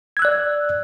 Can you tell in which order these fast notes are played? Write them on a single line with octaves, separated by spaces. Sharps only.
G#6 E6 F#6 D5